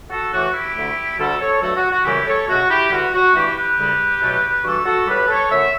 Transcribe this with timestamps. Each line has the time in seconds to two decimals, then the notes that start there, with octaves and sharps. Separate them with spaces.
0.10 F#4 A4
0.32 A2 E3 A3 F#4
0.53 E4 G4
0.75 D2 D3 A3
1.18 D2 D3 G3 F#4 A4
1.40 A4 C#5
1.61 G2 F#3 A3 F#4 A4
1.76 F#4
1.91 F#4
2.04 F#2 C#3 E3 G3 E4 G4
2.26 A4 C#5
2.48 C#2 B2 A3 F#4
2.69 E4 G4
2.91 E2 D3 G3 F#4
3.13 F#4
3.34 G2 E3 A3 E4 G4
3.56 G4 B4
3.77 D2 C#3 G3
4.21 E2 B2 F#3 A3
4.64 G2 E3 G3 F#4 A4
4.85 F#4 A4
5.07 A2 G3 G4 B4
5.28 A4 C#5
5.50 F#2 D3 A3 C#5 E5